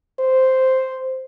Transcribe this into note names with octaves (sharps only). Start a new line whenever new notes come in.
C5